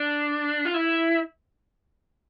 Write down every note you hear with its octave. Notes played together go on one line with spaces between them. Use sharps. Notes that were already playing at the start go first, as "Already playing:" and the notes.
Already playing: D4
F4
E4